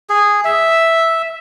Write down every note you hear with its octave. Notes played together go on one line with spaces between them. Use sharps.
G#4
E5